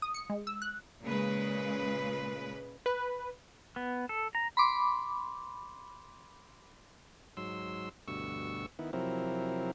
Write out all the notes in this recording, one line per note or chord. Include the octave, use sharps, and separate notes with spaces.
D#6
C#7
G#3
E6
F#6
A#2 C#3 G#3 B4
B4
B3
A4
A#5
B5 C6 D6
G#2 F#3 C6 E6
D2 G2 B2 C#6 E6
D#3 B3 E4
C3 F3 F#3 C4 E4 A#4